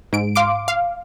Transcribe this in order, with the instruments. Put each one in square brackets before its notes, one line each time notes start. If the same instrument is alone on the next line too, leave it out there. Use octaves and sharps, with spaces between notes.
[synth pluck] G#2 D7
F5 C6 D6 D7
F5